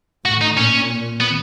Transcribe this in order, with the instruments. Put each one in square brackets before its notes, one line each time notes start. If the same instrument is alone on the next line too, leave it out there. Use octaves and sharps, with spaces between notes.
[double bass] A2 [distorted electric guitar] F#4
[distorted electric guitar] D#4
[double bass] A#2 [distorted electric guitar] C#4
[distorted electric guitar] B3